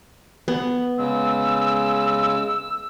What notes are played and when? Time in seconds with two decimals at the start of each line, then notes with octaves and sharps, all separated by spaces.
0.48 B3
0.98 C#3 G#3 E6